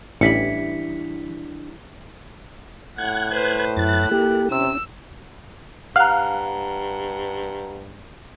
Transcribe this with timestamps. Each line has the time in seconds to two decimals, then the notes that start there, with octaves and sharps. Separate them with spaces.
0.21 A1 E3 G3 D4 B5 B6 C#7
2.98 A2 F#5 F#6 G#6
3.34 B4 C5
3.77 F#2 E4 F#6 A6
4.11 A#3 G4 A4
4.51 C3 C#4 E6
5.96 G2 F5 F#5 A#5 F6 F#6